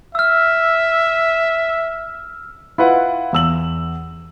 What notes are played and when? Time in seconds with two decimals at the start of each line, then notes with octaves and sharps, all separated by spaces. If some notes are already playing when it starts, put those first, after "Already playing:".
0.15 E5 E6 F6
2.78 E4 F4 B4 F5 F#5
3.33 E2 E6 F#7